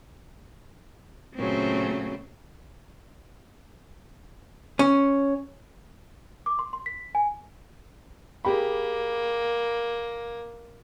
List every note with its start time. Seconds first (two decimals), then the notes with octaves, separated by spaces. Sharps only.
1.36 A#2 C#3 F#3 A3 C4
4.79 C#4
6.46 D6
6.59 C6
6.73 C6
6.86 B6
7.15 G#5
8.45 A#3 G4 G#4 B5